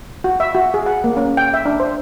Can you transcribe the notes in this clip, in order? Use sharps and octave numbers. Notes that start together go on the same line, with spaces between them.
F#4
E5
F#4
G#4
F#5
A#3
C#4
G5
E5
D4
C5